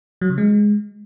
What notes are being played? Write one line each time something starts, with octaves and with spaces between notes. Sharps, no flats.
F#3
C#3
G#3